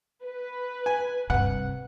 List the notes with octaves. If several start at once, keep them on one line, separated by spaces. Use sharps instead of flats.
B4
G#5
G2 C3 F#5